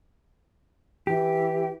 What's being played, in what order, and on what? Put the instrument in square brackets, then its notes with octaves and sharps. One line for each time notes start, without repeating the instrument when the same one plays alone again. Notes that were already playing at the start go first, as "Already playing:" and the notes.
[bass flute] E3 [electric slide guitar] G4